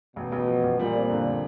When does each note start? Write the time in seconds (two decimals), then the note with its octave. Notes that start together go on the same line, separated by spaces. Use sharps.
0.16 A1 B2
0.32 A1
0.48 F3
0.63 A1
0.79 A#2 G3
0.95 C4
1.10 D3
1.26 D3